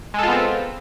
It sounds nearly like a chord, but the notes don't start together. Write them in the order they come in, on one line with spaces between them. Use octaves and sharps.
G#3 A4 F4 B3 C4